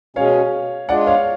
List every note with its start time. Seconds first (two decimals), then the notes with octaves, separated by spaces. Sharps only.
0.16 B2 G#3 C#4 C#5 F5
0.89 G#3 D4 F4 D5 F#5
1.07 C#5 F5